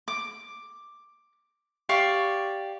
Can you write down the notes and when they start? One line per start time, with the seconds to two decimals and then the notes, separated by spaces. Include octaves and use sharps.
0.08 D6
1.89 G4 D5 F5 C#6